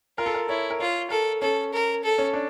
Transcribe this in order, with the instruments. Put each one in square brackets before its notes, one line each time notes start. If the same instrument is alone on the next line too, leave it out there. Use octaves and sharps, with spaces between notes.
[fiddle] F4 [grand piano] A#4
[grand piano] A4
A#4
[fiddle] E4 [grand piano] C#5
[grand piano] A#4
[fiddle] F4 [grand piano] C#5
[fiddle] A4 [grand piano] A#4
[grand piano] C#4 [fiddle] A4
[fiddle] A#4
A4
[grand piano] C#4
D4